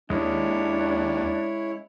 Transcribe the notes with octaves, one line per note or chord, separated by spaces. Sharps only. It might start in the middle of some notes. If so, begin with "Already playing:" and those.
D#2 G#3 C#4 D4 E4 C#5